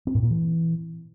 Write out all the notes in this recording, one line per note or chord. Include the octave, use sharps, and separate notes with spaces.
C4
A2
A#2
E3